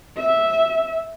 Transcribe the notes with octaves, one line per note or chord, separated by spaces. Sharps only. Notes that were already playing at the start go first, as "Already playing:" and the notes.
E5